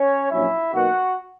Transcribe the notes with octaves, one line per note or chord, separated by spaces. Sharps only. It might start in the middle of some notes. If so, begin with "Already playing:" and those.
Already playing: C#4 C#5
A#1 A#2 F#3 C#4 E4 E5
B1 B2 A#3 F#4 F#5